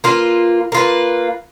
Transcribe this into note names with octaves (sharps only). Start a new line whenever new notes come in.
A#3 F4 B4
A#3 F4 B4